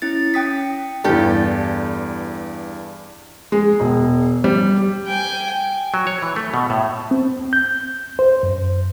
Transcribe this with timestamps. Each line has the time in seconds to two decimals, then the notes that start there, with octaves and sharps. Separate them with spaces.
0.02 C#4 E4 A6
0.34 C#4 G5 D#6 B6
1.04 E2 G2 G4 A4
3.52 G#3
3.80 E1
4.44 G3
5.07 G5 G#5
5.94 F#3
6.07 C#5
6.22 E3
6.36 A3
6.54 B2
6.70 A2
7.11 C4
7.53 G6
8.19 C5
8.43 F#2